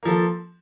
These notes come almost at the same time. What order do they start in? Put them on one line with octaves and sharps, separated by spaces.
A#3 F3 A4